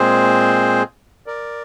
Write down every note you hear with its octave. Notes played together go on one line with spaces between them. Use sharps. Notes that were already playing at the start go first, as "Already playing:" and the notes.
Already playing: A#2 G#3 C4 G#4 C5
A#4 D5